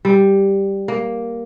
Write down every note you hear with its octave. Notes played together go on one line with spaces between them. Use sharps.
G3
A#3